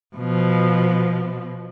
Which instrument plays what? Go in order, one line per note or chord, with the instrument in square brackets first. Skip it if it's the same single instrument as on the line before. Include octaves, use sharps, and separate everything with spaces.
[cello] B2 F3